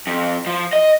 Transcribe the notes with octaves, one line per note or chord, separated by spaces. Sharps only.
F2
F3
D#5